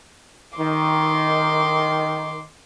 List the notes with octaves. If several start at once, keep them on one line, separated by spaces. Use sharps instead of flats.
D#3 C6 D6